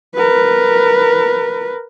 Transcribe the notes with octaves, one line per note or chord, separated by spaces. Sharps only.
A#4 B4